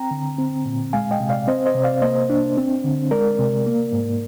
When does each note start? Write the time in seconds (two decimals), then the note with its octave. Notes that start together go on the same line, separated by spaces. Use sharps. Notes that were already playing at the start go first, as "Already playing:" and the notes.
Already playing: C4 G5 A#5
0.11 D3
0.38 C4
0.66 A#2
0.93 G#3 F5 G#5
1.11 D#5 G5
1.20 C3
1.30 D5 F5
1.47 C4 C5 D#5
1.66 C5 D#5
1.74 C3
1.83 D5 F5
2.02 A#3 C5 D#5
2.30 D4
2.57 C4
2.84 D3
3.11 G#3 A#4 D5
3.39 C3
3.66 A#3
3.93 G#2